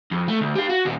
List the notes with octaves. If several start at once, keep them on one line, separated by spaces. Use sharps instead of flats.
F2
A3
D2
G4 F5
F#4
D#2 A#2